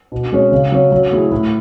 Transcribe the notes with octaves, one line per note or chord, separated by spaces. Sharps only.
B2
G#3 C#4
C#3
F#3 C#4
F#3
A3 E4 G#4
A2